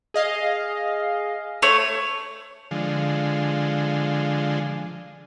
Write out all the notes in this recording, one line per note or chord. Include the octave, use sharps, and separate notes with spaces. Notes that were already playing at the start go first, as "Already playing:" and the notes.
G#4 D#5 F5
A3 C#5
D3 F3 G#3